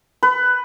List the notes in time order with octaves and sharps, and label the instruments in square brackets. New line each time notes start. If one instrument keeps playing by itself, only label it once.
[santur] B4